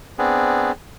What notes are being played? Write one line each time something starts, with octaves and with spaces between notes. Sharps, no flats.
B3 C4 D4 G#4